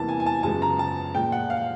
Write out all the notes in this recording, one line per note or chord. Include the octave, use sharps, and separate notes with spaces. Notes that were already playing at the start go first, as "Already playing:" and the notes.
Already playing: E2 C3 E3 G3 A#3 A5
G#5
G#5
A5
F#2 C#3 F3 G#3 B3 A5
A#5
A5
A#2 F3 G#3 G5
F#5
F5